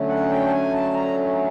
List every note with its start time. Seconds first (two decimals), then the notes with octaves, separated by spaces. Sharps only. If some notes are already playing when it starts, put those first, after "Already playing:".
Already playing: D3 F#3 A3 C#4
0.09 F#5
0.30 G5
0.47 A5
0.51 G#5
0.73 A5
0.93 A#5